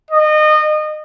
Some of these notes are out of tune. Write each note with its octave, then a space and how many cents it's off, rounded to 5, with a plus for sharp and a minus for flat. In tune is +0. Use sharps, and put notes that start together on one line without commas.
D#5 -25